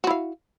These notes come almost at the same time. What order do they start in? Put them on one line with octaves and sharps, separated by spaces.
F#4 E4 F5